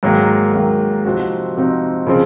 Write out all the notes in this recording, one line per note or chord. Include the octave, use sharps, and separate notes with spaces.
G#2 D#3 F#3 A#3
G#2 D#3 F#3 A#3
C3 F3 C4 D#4 F#4
C3 F3 C4 D#4 F#4
C#3 F3 C4